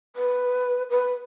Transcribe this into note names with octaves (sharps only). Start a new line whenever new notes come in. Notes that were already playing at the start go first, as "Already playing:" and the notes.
B4
B4